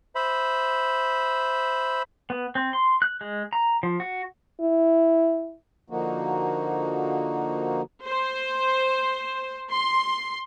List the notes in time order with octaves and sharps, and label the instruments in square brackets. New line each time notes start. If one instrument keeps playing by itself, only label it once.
[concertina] C5 E5 B5
[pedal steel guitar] B3
C4
C6
F#6
G#3
A#5
F3
F#4
[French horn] E4
[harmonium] D3 F3 A#3 D#4 F#4
[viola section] C5
C6